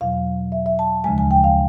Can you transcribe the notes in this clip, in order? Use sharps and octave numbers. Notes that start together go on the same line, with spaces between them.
E2 B2 F#3 F5
E5
E5
A5
D2 C#3 F3 G#3 G#5
G#5
G5
F5